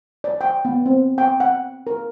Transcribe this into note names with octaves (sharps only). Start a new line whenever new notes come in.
D5
G5
B3
C4
G5
F#5
A#4